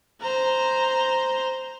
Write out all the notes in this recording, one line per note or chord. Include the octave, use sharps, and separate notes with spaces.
C5 A#5